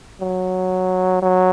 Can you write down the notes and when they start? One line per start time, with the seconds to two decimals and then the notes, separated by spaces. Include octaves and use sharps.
0.21 F#3
1.22 F#3